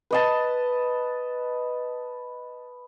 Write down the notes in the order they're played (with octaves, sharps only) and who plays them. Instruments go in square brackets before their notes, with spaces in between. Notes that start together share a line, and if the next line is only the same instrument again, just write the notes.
[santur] B4 D#5 A5